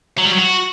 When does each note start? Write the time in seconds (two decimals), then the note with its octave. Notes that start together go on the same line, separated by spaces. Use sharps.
0.18 F#3
0.25 G3
0.32 F#3
0.38 F#4